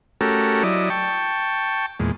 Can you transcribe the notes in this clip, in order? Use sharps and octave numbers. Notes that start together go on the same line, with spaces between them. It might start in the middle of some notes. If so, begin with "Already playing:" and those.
A3 C#4 F#4 G4 A4 A#4
F#3 E4 D5 D#5
G5 A5 C#6
E2 A#2 G#3